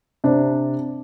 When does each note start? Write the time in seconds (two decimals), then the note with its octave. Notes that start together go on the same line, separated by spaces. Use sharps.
0.24 C3 D4